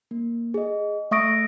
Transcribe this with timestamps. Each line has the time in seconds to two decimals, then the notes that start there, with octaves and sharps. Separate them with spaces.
0.11 A#3
0.54 G#4 D#5
1.11 A3 E5 C#6 D#6 A#6 D7